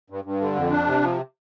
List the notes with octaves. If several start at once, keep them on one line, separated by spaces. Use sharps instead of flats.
G2
G2
D3
F2
D4
C3
F3